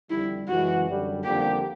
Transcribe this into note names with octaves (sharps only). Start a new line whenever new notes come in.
F2 D3 G3 E4
F#2 C#3 E3 G#3 F#4
F#2 D3 G3
F2 D3 G3 A#3 G4